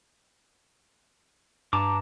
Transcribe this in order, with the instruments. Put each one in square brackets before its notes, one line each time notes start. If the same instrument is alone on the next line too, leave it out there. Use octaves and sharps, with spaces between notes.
[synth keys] G2 [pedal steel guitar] A5 A#5 D6